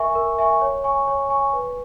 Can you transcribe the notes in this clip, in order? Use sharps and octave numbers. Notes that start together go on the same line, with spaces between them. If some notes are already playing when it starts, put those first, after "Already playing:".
Already playing: A#4 E5 G#5 C#6
A#4
E5 G#5 C#6
C#5
G#5 C#6
C#5
G#5 C#6
B4